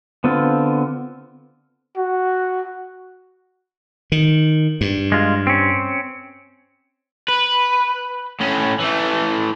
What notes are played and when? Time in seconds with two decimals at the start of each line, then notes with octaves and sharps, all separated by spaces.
0.24 D3 B3 C4 F4
1.97 F#4
4.12 D#3
4.81 G2
5.12 G#3 F4
5.47 C4 C#4
7.28 B4
8.40 A2 C#4
8.80 E3 A3